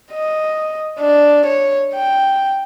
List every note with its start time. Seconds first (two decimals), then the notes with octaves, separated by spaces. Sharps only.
0.12 D#5
1.00 D4
1.47 C#5
1.94 G5